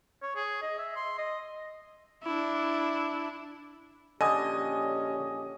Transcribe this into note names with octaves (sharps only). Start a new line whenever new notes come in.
C#5
G#4
D#5
E5
C6
D#5
D4 E4
A#1 D3 C#4 G4 D#5 G#5 D#6